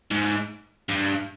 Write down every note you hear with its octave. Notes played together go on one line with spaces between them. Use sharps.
G#2
G2